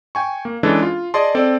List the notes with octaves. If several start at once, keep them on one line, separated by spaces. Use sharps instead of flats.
G5 G#5 C#6
A#3
E3 G#3 C#4 D4 A4
F4
G#4 D5 D#5 A5 C6
C4 A4 D5